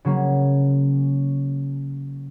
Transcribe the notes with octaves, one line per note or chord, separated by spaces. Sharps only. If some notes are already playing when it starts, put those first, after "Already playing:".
C#3 F#3 A#3 C#4